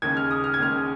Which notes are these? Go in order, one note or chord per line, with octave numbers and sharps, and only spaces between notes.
D#2 C#3 G#3 G#6
F6
D#6
F6
G#6
D#2 C#3 G#3 F6